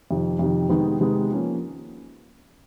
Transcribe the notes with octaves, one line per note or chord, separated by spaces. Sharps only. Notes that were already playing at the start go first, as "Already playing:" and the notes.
F2 C3 D#3
F2 C3 D#3
C3 D#3 G#3 B3 D#4
C3 D#3 G#3 B3 D#4
F3 A#3 C#4